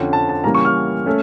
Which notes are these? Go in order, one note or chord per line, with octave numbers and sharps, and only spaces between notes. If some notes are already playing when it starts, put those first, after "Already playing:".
Already playing: F2 D3 F3 C#4 G5
A5
A5
C#3 E3 G3 A#3 C#4 A#5
C#6
F6
A3 C#4